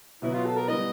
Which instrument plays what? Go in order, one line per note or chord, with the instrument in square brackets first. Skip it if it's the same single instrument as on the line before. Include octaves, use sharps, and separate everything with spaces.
[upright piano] B2 F#3 B3 [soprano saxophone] E4
[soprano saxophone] F4
A4
A#4
[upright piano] G3 B3 E4 [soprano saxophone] D#5